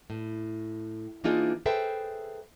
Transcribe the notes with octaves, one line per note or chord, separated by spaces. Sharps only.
A2
E3 A#3 D4 D#4 F4 G#4
G#4 A4 B4 C5 E5 G5